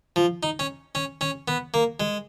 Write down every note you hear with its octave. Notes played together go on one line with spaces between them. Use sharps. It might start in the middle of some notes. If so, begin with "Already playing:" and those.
F3
D#4
C#4
C#4
C#4
B3
A#3
G#3